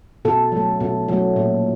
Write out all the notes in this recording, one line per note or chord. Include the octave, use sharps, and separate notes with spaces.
B2 A4
F#3 A3
B2
F#3 A3
A#2